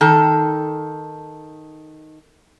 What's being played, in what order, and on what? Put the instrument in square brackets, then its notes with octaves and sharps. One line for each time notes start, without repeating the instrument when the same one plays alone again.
[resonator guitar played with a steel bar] D#3 A4